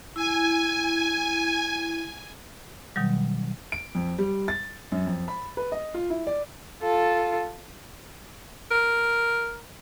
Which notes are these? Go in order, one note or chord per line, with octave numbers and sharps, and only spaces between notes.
E4 G#5
B2 D#3 F#3 G3
D7
F2
G3
A6
F#2
F2
B5
B4
D#5
F4
E4
D5
F4 A4
A#4